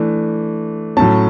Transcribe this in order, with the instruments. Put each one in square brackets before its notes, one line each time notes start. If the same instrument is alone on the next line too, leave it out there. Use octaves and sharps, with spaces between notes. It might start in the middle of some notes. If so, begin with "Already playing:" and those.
Already playing: [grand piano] E3 A3 D4
A2 F#3 A3 C#4 A5